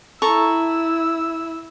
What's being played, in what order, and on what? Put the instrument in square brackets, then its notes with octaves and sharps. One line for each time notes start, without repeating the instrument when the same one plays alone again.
[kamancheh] E4 E6 [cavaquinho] A4 A#5 C#6